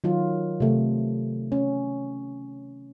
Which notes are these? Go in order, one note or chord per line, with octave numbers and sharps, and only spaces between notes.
D#3 F#3 F4
C3 A3
C#4